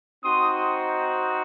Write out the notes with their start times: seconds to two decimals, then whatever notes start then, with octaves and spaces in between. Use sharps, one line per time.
0.24 C4 D#4 F#4 C6 D#6